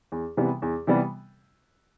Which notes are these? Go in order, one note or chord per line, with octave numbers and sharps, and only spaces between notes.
E2
C3 E3 G3 B3
E2
C3 E3 G3 B3